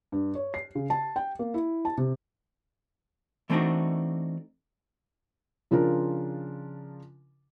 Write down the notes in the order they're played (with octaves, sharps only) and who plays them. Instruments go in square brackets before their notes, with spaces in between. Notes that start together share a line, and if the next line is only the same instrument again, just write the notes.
[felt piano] G2
C#5
C7
C#3
A5
G5
A#3
E4
A5
C3
[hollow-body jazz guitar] E3 A3 C4 D4 D#4 F#4
[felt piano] C#3 F3 D4 F4 A#4